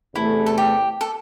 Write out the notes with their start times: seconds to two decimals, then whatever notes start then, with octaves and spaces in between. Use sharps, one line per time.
0.14 E2 C3 E3 A3 E4
0.46 A4
0.58 G4
1.01 A4